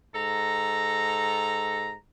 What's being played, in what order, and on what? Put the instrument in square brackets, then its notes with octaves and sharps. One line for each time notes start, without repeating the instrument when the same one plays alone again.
[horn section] G#2 A4 A#5